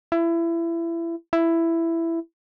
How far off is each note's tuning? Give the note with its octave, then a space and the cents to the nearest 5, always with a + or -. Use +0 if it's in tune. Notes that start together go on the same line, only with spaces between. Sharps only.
E4 +25
E4 +10